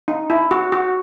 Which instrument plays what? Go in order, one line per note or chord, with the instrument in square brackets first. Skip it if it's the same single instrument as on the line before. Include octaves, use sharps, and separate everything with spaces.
[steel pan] D#4
E4
F#4
F#4